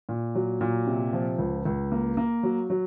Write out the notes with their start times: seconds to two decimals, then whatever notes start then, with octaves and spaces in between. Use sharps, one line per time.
0.09 A#2
0.35 F#3
0.61 A#2
0.87 C3
1.13 F3
1.38 C#2
1.65 C#2
1.92 A#3
2.17 A#3
2.43 F#3
2.70 F#3